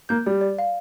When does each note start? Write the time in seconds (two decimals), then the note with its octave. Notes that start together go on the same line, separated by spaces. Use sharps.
0.09 A#3 G6
0.26 G3 D5
0.41 D5
0.59 F5